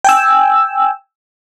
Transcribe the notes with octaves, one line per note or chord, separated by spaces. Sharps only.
G5 G#5 E6